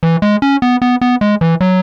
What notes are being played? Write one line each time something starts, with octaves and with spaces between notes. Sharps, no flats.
E3
G#3
C#4
B3
B3
B3
G#3
E3
F#3